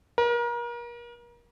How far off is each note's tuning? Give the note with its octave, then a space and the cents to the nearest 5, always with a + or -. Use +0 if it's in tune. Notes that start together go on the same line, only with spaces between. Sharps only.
A#4 +35